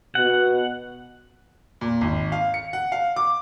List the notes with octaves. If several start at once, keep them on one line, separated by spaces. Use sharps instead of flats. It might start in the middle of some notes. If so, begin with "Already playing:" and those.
B2 F#5
A#2
G#1
F5
C#7
F#5
F5
D6